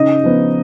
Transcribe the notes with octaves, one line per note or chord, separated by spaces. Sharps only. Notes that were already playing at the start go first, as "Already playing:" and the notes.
Already playing: C#3 D#4 D#5
F3 B3